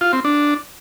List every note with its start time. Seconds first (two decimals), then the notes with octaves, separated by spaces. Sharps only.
0.01 F4
0.13 C4
0.25 D4